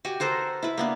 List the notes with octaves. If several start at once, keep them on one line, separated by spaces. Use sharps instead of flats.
F#4 G4 G#5
A4 A#4 C5 F#5
E4 B4
A#3 B3 D4